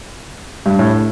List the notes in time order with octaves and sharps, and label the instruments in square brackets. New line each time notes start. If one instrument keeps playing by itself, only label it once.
[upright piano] G2
A2